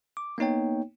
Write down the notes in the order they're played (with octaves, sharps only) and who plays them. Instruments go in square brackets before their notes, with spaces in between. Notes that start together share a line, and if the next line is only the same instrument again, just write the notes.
[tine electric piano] D6
A#3 B3 D#4 C#5 G5